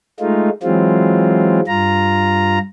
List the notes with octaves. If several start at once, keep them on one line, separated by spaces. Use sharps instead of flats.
G#3 A3 D#4 F4
E3 F#3 G#3 C4 F4
G2 F4 A#5